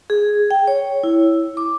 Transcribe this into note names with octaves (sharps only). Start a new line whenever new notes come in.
G#4
G5
C#5
E4
D6